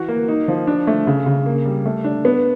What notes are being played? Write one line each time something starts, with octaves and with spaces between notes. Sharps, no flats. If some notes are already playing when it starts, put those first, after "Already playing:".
Already playing: E3 F#4
A#3
D#4
F3
D4
A3
C#3
C#3
A#3
G3
A3
D4
B3